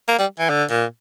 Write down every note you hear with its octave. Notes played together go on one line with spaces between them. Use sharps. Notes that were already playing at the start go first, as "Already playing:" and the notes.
A#3
G3
E3
D3
A#2